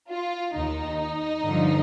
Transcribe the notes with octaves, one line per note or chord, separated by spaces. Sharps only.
F4
D#2 D#3 D#4
G2 D3 F3